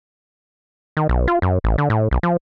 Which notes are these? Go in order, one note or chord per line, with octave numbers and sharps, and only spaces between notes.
D#3
B1
F4
F#2
A1
D3
A2
B1
F3